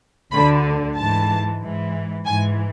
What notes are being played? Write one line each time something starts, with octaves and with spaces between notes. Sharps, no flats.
D2 D3 B5
G#2 E3 A5
G#2 E3
G#2 E3 G#5